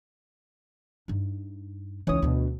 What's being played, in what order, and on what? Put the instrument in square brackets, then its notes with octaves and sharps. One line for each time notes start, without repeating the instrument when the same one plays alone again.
[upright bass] G2 D#4
[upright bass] C#2 D#4 [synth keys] E3 C#5 D#6
[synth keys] D2 B2 [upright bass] B3 D4